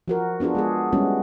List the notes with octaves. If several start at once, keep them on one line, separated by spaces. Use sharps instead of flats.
F3 F#4 A#4
B3 D4 F4 F#4 G#4
G#3 B3 G#4
G3 G#3 B3 C#4 E4 F#4